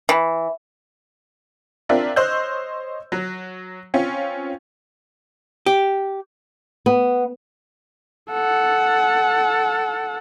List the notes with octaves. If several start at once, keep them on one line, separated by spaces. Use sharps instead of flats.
E3
C4 D4 F4 A#4 D5 E5
C5 C#5 D#5 E6 F#6 G6
F#3
C4 C#4 F4
G4
B3
A4 F#5